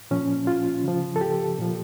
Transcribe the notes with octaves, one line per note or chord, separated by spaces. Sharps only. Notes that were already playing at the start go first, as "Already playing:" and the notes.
A#2 F3 C#4
F4
C#3 F3
A4
G4
A#2 F3